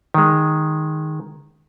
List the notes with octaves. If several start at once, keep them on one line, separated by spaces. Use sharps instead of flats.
D#3 G#3